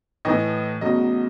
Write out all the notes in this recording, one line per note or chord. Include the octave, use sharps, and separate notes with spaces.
A2 E3 A3 D#5
E2 C#3 F#3 A3 D#5